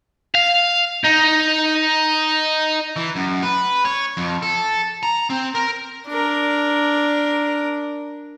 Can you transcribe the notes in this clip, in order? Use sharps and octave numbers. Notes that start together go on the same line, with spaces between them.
F5
D#4
E3
F#2
B4
C#5
F2
A4
A#5
C4
A#4
D4 A#4